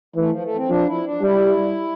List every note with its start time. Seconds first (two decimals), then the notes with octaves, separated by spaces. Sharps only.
0.16 E3 A3
0.29 F3
0.43 A3
0.56 C4
0.69 F3 D4
0.86 E4
1.04 D4
1.21 G3 E4